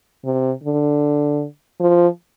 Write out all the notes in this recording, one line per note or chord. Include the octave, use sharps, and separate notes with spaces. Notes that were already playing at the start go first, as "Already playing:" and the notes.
C3
D3
F3